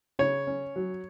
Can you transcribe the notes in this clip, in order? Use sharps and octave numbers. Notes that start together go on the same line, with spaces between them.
C#3 C#5
C#4
F#3